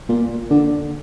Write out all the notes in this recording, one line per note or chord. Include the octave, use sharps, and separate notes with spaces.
A#2
D3